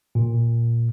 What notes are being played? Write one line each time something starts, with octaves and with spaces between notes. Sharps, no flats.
A#2